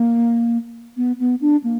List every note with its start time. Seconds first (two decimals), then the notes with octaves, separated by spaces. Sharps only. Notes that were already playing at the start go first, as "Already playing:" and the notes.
Already playing: A#3
0.97 B3
1.20 B3
1.41 D4
1.64 A#3